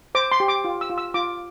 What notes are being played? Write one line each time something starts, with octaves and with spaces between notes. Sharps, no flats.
C5 D6
C6
G4
D6
F4
E6
F4
E6
F4 D6